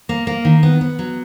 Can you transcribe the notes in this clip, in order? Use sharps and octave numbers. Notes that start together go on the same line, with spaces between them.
A#3
A#3
D#3
B3
B3
F#3